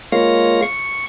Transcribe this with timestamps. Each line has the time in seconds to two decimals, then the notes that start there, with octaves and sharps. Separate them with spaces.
0.12 G#3 A#3 F4 C#5 F5 A#6
0.62 C#6